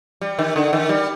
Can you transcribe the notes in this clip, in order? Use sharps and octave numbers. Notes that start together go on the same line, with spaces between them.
G3
D#3
D3
D#3
G3